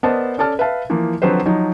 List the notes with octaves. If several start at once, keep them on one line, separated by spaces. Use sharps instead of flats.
B3 A#4 C5 D5 D#5 A5
C#4 A4 D5 A5 F6
B4 E5 F5 A5
E3 F3 A#3
D3 F3 F#3 C4 B4 C5
F3 F#3 D#4